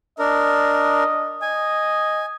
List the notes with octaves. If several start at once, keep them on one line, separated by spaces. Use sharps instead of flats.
D4 A#4 D#5
D#5 G#5